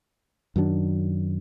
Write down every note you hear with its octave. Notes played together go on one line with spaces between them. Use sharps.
F#2 D#3 F#3 D4